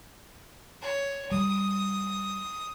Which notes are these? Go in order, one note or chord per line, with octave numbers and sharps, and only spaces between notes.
C#5
G3 D#6